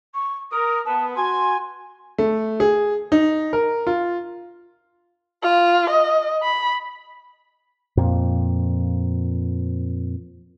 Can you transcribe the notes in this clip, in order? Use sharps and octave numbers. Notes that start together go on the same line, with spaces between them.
C#6
A#4 D#6
B3 A5
F#4 G#5 C6
A3
G#4
D#4
A#4
F4
F4
D#5
B5
F2 A#2 F3